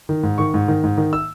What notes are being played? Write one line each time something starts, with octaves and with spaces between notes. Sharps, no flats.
D#3
G#2
D#3 C#6
G#2
D#3
G#2
D#3
E6